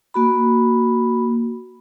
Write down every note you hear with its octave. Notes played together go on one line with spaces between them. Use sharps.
A#3 F#4 B5